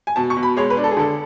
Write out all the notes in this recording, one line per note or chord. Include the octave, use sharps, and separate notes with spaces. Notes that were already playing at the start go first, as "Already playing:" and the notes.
G#5
B2 A5
C#6
B2
B5
G#3 C#5
B4
D4
A4
G#4
D3 A4